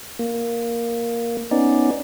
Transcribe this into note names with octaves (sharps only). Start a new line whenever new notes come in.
A#3
B3 C#4 D#4 D5